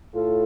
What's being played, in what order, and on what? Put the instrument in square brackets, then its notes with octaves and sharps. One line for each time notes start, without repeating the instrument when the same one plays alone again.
[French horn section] A2 F4 A4